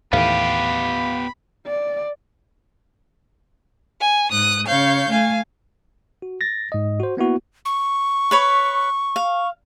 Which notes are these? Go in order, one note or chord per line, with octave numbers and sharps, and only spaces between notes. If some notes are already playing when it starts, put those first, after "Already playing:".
D#2 A2 E3 B3 G4 F5 B5
D5
G#5
G#2 D#6 F#6
C#3 C#5 F5 G6
A3 F5 G#5
F#4
A6 A#6
G#2 D#5
F#4 C5
A#3 B3 E4 F#4
C#6
B4 C#5 B5
F5